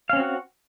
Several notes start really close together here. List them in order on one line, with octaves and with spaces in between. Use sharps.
F5 C#4 C4 F#4 F#5